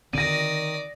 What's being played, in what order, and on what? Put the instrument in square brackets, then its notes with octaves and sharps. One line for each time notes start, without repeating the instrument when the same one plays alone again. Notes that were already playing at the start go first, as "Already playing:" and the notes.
[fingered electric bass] D3 C4 [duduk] D#3 [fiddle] D5 D#6 [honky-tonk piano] A#6 D#7